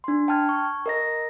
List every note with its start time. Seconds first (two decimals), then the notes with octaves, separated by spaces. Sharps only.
0.04 D4 C6
0.28 G5 A5 F6 G#6
0.49 C#6
0.86 A#4 D#5 A#6